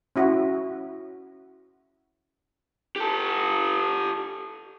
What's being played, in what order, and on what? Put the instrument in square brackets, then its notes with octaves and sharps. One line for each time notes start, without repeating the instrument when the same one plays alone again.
[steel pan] C#4 E4 F#4
[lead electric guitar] G4 A4